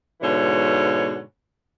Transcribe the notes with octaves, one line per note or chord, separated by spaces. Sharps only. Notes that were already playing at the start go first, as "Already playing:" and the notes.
G#2 B2 D3 E3 C#5